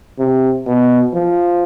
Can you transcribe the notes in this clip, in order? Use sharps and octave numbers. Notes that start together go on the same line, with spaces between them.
C3
B2
F3